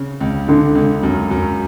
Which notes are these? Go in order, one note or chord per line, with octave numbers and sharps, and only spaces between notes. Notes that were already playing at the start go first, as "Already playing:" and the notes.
Already playing: C#3
C#2
C#2 D3
C#2
F#2
F#2